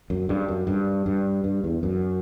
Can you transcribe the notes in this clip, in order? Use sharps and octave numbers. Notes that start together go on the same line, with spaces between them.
F#2
G2
F#2
G2
G2
G2
E2
F#2